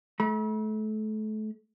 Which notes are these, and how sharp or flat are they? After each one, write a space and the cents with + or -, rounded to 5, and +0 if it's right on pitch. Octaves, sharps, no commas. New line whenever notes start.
A3 -30 B5 -45